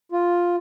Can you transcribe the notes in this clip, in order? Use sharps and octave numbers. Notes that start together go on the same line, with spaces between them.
F4